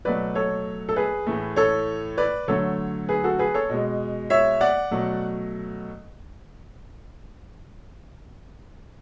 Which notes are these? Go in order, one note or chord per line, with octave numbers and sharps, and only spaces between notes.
B2 F#3 A3 B4 D5
A4 C#5
A4
G#4 B4
A2 E3 A3
A4 C#5
B4 D5
D3 F#3 A3 A4 C#5
G#4 B4
F#4 A4
G#4 B4
A4 C#5
B2 G#3
C#5 E5
D5 F#5
B2 F#3 A3